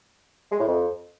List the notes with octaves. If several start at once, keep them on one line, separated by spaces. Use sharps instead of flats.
G#3
A2
F2